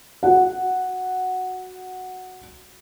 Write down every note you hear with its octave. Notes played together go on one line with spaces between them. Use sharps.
F#4 F#5